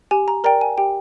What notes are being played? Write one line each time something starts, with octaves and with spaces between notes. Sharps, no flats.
G4 G#5
A#5
A#4 D5 G5 A#5
G#5
G4 G5